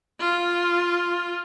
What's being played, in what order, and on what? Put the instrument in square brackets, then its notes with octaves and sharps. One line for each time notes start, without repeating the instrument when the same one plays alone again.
[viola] F4